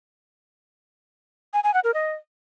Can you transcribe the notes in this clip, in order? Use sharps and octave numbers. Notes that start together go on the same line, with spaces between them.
G#5
G#5
F#5
A#4
D#5